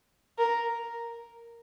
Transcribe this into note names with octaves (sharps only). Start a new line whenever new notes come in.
A#4